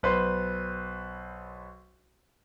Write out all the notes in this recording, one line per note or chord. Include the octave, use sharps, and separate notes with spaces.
B1 B4 C5 C6